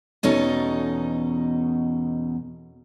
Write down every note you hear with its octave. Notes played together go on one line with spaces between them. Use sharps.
E2 B2 C#4 D#4 A4